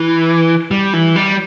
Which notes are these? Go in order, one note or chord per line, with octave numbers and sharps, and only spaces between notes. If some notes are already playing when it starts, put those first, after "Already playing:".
Already playing: E3
G3
E3
G3